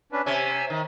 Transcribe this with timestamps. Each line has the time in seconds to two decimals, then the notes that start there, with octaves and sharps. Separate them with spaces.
0.12 C#4 D4 B4
0.26 C3 C#4 E5 G#5 E6
0.70 D#3